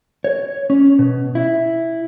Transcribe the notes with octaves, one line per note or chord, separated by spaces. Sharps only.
C#5
C#4
B2
E4